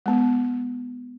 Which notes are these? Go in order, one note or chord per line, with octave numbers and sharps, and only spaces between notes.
G#3 B3